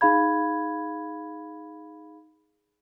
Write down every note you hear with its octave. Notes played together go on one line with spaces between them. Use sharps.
D#4 G#4 F5 B5 G#6